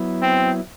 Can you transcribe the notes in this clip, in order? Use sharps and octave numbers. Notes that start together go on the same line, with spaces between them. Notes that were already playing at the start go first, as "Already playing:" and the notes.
Already playing: F#3 B3 E4
C4